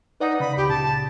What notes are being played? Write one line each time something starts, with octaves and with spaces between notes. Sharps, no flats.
D#4 B4 D5 F#5
C#3 B5
C#2 G4
A#2 C#3 A5